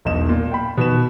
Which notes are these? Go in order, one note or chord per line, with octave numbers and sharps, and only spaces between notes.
E1 B1 D#4 E7
A#2
G5 B5
B2 D#3 B4 E7